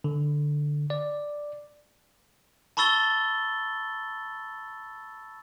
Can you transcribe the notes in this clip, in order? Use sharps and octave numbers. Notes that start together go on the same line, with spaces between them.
D3
D5
A5 B5 C#6 E6 A6 G7